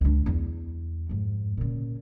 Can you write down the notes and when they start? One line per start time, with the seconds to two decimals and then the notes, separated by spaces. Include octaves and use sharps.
0.01 C#2 D4
0.26 E2 G3
1.09 F2 G#2
1.57 A#2 C#3